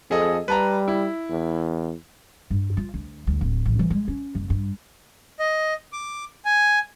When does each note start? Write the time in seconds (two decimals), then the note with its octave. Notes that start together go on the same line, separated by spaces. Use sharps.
0.11 F2 G#4 A4 D#5
0.48 G3 B4 A5 A#5
0.88 E4
1.30 E2
2.50 G2
2.77 F4
2.94 D2
3.27 D2
3.41 D1
3.66 A1
3.79 E3
3.90 G#3
4.08 C#4
4.35 F#1
4.50 G2
5.39 D#5
5.93 D6
6.45 G#5